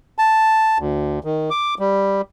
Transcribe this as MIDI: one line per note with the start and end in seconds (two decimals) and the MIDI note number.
0.18 0.78 81
0.79 1.19 38
1.24 1.50 51
1.50 1.75 86
1.79 2.21 55